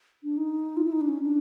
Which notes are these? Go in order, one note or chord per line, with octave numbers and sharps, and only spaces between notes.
D4
D#4
F4
E4
D#4
D4
C#4
D4